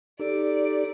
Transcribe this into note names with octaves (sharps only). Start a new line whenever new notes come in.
D#4 G4 A4 D5